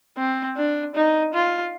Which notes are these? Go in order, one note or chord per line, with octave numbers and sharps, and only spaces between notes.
C4
D4
D#4
F4